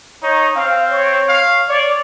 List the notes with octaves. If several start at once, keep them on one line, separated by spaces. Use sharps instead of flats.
D#4 C#5
C4 F5
C#5
F5
C#5 D5